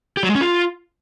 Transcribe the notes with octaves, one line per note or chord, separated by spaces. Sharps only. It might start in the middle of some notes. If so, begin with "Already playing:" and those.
G4
F#3
G#3
C#4
F4